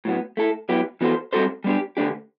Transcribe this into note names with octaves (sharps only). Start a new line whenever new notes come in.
A2 F#3 B3
A3 E4 A4
F#3 B3 E4 G4
E3 B3 F#4 A4 C5
G3 C4 F#4 A4 C5
G3 B3 D4 G4
D3 A3 D4 G4